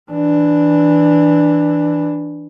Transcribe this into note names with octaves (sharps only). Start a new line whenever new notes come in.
E3 D4